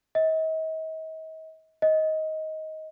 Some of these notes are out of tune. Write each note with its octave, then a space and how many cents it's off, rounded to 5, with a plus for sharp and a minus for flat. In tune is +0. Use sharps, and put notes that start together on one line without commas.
D#5 +40
D#5 +15